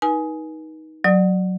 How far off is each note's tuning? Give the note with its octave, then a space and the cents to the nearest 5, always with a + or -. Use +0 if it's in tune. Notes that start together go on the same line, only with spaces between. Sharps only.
D#4 +15 B4 -40 G#5 +15
F#3 +0 D5 +25 D#6 +20